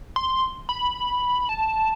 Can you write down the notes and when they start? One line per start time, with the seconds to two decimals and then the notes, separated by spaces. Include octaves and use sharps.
0.16 C6
0.69 B5
1.49 A5